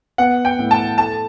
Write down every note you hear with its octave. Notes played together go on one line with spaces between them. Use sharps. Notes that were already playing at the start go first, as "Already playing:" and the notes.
B3 F#5
G5
A2
A5
A3 A5